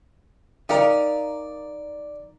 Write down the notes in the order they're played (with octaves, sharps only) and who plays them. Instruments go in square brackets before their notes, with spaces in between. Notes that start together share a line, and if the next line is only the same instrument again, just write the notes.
[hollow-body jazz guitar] D#4 A#4 [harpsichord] D5 [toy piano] F5 G5